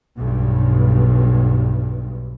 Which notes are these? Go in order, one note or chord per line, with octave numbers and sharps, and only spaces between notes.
B1 G2